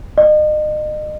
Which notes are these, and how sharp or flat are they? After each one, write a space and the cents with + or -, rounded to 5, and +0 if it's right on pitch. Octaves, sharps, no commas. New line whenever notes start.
D#5 -35